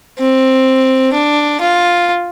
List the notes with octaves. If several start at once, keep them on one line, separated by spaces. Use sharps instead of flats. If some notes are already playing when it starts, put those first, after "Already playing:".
C4
D4
F4